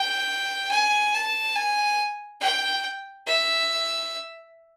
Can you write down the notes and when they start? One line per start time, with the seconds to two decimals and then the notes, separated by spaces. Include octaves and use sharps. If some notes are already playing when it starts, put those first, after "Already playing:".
Already playing: G5
0.71 G#5
1.14 A5
1.56 G#5
2.41 G5
3.27 E5